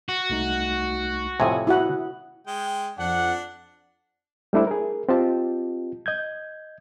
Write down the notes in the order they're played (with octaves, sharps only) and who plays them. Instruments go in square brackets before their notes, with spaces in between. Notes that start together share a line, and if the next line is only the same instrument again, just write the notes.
[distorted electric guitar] F#4
[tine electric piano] C2 A3 D#4
[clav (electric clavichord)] F2 A2 C3 [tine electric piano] E5 D#6 [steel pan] G#5
[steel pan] E4 F#4 F#5
[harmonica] G#3 G5
[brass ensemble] F2 F#5 [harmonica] D4
[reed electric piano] G3 A3 D4 E4 C5
G#4 A#4
C4 F4 G4 D#5 A5
D#5 G6 G#6